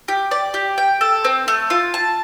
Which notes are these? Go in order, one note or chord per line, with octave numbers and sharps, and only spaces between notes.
G4
D5
G4
G5
A4
C4
A3
F4
A5